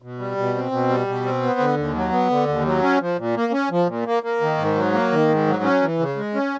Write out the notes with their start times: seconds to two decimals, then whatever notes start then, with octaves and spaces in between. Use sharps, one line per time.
0.02 B2
0.19 G3
0.37 B2
0.55 C4
0.71 B2
0.89 G3
1.07 B2
1.25 C4
1.42 B3
1.60 D3
1.77 D#2
1.95 F#3
2.12 B3
2.30 D3
2.48 D#2
2.65 F#3
2.82 C#4
3.00 F3
3.18 A#2
3.36 A#3
3.52 C#4
3.71 F3
3.87 A#2
4.06 A#3
4.23 A#3
4.41 D#3
4.58 G#2
4.75 F#3
4.93 A#3
5.11 D#3
5.28 G#2
5.47 F#3
5.63 C#4
5.82 E3
5.99 C#3
6.16 G#3
6.34 C#4